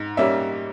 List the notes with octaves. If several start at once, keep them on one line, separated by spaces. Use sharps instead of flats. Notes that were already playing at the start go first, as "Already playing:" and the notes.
Already playing: G#2
G3 A#3 C#4 E5